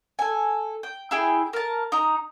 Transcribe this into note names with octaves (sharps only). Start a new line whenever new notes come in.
A4 G#5
G5
E4 G#4 G5
A#4 A5
D#4 A#5